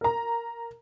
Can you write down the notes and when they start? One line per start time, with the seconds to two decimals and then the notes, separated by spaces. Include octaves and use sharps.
0.01 A#4 A#5